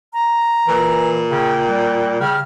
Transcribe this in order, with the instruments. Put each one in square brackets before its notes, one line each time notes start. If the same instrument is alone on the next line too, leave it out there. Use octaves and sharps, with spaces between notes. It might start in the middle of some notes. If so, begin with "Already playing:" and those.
[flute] A#5
[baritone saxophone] A#2 [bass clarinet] E3
[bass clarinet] C#3 [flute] G5
[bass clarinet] G3
[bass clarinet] C#3 [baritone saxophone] G3 [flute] F6